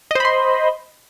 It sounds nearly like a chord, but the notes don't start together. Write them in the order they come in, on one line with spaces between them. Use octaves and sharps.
D#5 C5 B5 C6